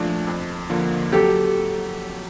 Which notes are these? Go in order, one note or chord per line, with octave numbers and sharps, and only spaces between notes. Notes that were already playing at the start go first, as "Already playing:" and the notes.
Already playing: A#2 F3 A3 D4
F2
D3 F3 A#3
F#3 G4 A4